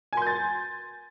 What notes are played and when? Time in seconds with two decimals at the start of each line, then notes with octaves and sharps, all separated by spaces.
0.13 G#5
0.17 C6
0.22 G6
0.27 A6